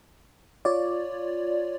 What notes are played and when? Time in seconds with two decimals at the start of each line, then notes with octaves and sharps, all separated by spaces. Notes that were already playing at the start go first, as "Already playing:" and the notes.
0.65 F4 C#5 D5